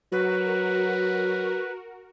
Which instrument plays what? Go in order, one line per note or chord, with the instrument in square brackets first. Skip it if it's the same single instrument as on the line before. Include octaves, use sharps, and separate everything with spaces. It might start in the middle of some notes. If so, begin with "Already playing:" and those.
[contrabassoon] F#3 [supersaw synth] F#4 A#4 [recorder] B4